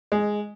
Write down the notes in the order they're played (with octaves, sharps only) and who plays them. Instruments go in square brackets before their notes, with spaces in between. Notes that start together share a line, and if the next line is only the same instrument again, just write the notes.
[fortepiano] G#3